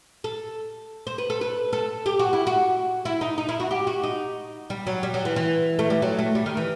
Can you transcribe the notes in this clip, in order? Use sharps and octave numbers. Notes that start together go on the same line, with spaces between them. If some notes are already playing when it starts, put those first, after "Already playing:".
A4
C5
B4
A4
B4
A4
G4
F#4
E4
F#4
E4
D#4
D#4
E4
F#4
G4
F#4
D#4
G3
F#3
G3
F#3
E3
E3
A3
G3
F#3
A3
G3
D#3
E3